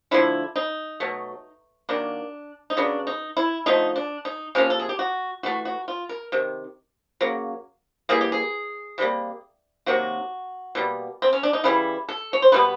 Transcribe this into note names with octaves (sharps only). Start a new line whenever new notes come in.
D3 F3 A3 E4
D#4
B2 F#3 A3
D#3 F#3 A#3 D4
D#4
C#3 F#3 B3 D4
D#4
E4
D3 F3 A3 D#4
D4
D#4
C3 F3 A#3 C#4
A4
G#4
G4
F#4
E3 A3 F#4
F#4
F4
A#4
C3 D#3
C#3 F#3 A#3
E3 G3 A#3 G#4
G4
G#4
C3 E3 G3 A#3
C3 D#3 F#3 A#3 F#4
B2 G3 A#3
C4
C#4
D4
D#4
C#3 E3 G3 E4
A4
C#5
C5
B2 G3 B3 B4